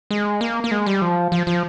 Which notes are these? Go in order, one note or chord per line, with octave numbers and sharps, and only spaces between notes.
G#3
A#3
A#3
G#3
G3
F3
F3
F3